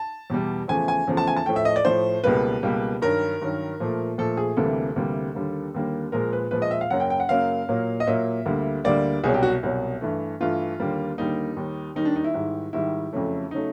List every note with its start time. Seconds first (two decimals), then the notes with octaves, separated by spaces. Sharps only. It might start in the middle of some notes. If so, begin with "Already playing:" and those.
Already playing: A5
0.30 E2 B2 G3
0.68 E2 C#3 F3 A3 G#5
0.88 G#5
1.07 E2 C#3 F3 A3
1.17 A5
1.27 G#5
1.36 A5
1.46 A2 F3 A3 G5
1.56 E5
1.65 D#5
1.76 D5
1.85 A2 F3 A3 C5
2.24 C#2 B2 G3 A#3 B4
2.63 C#2 B2 G3 A#3
3.02 G2 D#3 F#3 A#4
3.41 G2 D#3 F#3
3.80 A#2 F3 A3
4.18 A#2 F3 A3 A4
4.37 G#4
4.57 D2 C3 E3 G3 A#3 A4
4.96 D2 C3 E3 G3 A#3
5.35 D#2 D3 G3 A#3
5.74 D#2 D3 G3 A#3
6.12 A#2 F3 G#3 A#4
6.33 B4
6.51 A#2 F3 G#3 B4
6.62 D#5
6.71 E5
6.81 F5
6.90 F#2 C#3 F#3 A#3 F#5
7.00 G5
7.10 G5
7.20 F#5
7.29 F#2 C#3 F#3 A#3 F5
7.69 A#2 F#3 A#3
8.00 D#5
8.07 A#2 F#3 A#3 E5
8.45 D2 D3 G3 A#3
8.84 D2 D3 G3 A#3 D5
9.24 C2 B2 F#3 G#4
9.34 G4
9.43 F#4
9.63 C2 B2 F#3
10.01 G2 E3 A3
10.41 G2 E3 A3 F4
10.80 D#2 D3 G3 A#3
11.18 D#2 D3 G3 A#3 D#4
11.57 D#2 D#3 G3
11.95 D#2 D#3 G3 D#4
12.05 D4
12.16 D#4
12.24 E4
12.34 G#2 D#3 G3
12.73 G#2 D#3 G3 E4
13.13 F2 C#3 F#3 A3
13.51 C#3 F#3 A3 D#4